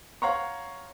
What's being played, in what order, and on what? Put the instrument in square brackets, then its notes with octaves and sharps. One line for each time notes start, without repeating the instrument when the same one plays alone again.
[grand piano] C#5 F5 F#5 A#5 C6 C#6